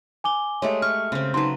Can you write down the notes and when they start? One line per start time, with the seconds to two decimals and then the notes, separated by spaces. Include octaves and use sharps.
0.24 G#5 D6 G7
0.62 G#3 A3 G4 C#5
0.82 C#6 F6
1.12 C#3 C4
1.34 F#3 D#4 B4 C6